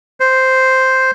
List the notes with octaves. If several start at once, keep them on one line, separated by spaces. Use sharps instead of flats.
C5